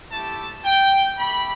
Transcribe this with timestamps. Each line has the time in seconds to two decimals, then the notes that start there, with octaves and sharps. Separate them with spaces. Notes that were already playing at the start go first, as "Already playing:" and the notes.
0.11 A3 E4 G4 A5
0.65 G5
1.18 A3 G4 B5